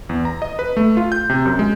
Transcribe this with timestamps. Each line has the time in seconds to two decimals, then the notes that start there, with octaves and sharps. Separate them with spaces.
0.09 E2
0.25 A#5
0.42 D#5
0.59 B4
0.77 A3
0.97 F4
1.12 G6
1.30 C3
1.45 F#2
1.59 G#3